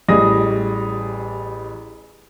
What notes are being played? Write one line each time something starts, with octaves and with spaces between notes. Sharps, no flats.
A1 G3 G#4 D#5 D#6 A#6